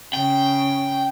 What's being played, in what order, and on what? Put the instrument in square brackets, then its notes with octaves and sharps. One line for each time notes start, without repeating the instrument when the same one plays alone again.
[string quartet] C#3 [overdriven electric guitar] G5